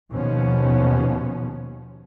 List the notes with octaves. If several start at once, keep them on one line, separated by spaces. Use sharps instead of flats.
D#2 B2 F3 B3 C#4